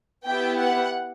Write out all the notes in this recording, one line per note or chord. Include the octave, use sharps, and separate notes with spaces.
B3 E4 G4 G5
F#5